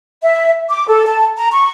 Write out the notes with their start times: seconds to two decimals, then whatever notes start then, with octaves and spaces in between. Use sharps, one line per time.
0.22 E5
0.69 D6
0.88 A4
1.06 A5
1.37 A#5
1.52 C#6